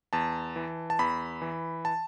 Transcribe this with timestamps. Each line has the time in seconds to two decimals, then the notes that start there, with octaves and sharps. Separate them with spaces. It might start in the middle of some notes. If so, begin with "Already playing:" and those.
0.13 E2 A5
0.56 E3
0.90 A5
0.99 E2 B5
1.42 E3
1.85 A5